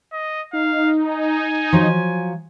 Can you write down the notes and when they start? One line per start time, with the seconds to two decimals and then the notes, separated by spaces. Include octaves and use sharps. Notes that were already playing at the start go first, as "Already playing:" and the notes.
0.13 D#5
0.53 D#4 F5
1.07 G#5
1.73 F3 F#3